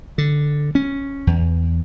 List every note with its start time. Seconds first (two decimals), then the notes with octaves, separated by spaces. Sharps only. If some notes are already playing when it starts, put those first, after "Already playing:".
0.18 D3
0.75 C#4
1.27 E2